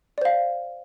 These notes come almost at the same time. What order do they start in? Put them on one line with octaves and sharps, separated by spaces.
D5 C5 F5